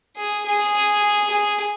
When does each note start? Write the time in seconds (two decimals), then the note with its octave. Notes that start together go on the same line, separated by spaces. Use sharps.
0.16 G#4
0.45 G#4
1.30 G#4